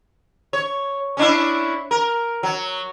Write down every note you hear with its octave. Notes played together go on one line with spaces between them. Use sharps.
C#5
C#4 D4 E4
A#4
F#3